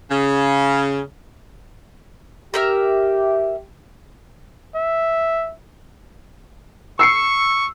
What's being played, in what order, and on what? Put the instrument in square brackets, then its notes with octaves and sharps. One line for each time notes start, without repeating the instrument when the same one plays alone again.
[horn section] C#3
[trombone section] G4 [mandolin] A#4 E5 F6
[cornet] E5
[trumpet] C#6 [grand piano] E6 C7 C#7